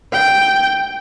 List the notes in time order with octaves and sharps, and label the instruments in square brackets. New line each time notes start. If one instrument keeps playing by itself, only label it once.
[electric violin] G5